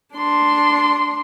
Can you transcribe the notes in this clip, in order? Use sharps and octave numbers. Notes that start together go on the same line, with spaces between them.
D4 C6